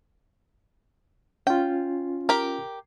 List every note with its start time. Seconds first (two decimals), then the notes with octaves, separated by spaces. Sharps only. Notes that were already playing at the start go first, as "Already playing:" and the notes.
1.47 C#4 F4 G5
2.29 G4 A#4